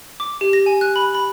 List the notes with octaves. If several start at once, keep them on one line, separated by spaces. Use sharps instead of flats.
D6
G4
A#6
G#5
F#6
B5
B5